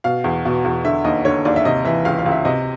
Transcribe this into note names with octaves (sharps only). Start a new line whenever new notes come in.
B2 F5
E2
B2
E2
D3 E5
D#2 D#5
D3 C#5
D#2 D5
E5
C3 D#5
E3 E5
C#2 F5
F5
C#2
E5
C3 D#5